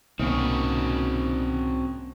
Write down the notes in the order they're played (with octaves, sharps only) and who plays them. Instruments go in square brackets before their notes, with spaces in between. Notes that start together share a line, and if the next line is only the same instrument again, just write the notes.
[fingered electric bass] C2 [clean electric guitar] B2 D#3 [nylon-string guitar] A#3 C#4 D#5 [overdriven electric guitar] C4 F#4